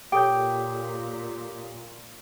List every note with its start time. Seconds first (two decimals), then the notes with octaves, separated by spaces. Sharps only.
0.12 A#2 G4 A4 C#5 G5 D6 D#6 G6